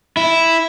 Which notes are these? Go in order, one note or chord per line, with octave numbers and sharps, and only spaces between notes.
E4